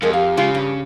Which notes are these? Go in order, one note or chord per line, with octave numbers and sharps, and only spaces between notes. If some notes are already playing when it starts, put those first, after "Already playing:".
F2 F3 G#3 A#4
G4 F5
C#3 G#3 F4
G2